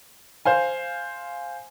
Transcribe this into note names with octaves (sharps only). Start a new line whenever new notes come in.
C5 F5 G#5